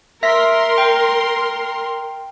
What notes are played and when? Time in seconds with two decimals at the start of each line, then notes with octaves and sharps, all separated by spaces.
0.23 A#4 E5 C6 A#6 B6
0.78 G5